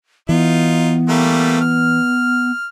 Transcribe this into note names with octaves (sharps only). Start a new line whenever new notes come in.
E3 B3 D#4 F4
G3 A3 A#3
F6